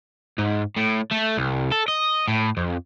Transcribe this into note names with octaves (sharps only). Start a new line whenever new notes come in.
G#2
A2
A3
C2
A4
D#5
A2
F2